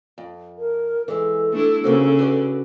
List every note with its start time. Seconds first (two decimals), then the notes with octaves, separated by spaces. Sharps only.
0.18 F2
0.58 A#4
1.08 E3 G#3 A4
1.53 A3 D4 E4
1.84 C#3 A#3 C4 F#4
2.19 F#4 B4 D5